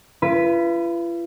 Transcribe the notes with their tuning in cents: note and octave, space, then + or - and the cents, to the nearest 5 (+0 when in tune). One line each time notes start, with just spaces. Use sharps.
F4 -45 B4 +0